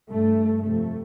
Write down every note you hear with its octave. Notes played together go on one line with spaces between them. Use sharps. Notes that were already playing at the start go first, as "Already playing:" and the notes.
G2 A3
F2 C3 A3